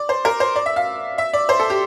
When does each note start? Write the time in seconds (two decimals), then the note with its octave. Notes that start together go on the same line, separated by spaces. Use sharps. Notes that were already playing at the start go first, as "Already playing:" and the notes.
Already playing: D5
0.09 C5
0.25 A#4
0.40 C5
0.56 D5
0.66 E5
0.76 F5
1.18 E5
1.33 D5
1.49 C5
1.59 A4
1.70 G4